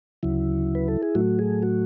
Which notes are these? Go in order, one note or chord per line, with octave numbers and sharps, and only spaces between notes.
D2 C#3 F#3 E4
B4
A4
G#4
A2 F#3 A3 F#4
G#4
F#4